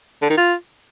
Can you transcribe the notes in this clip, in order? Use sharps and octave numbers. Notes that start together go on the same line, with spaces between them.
D3
D#3
F4